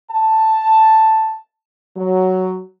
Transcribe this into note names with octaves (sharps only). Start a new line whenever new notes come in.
A5
F#3